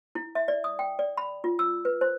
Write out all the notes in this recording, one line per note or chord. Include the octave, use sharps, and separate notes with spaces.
E4
E5
D5
D#6
G5
D5
B5
F4
E6
B4
C5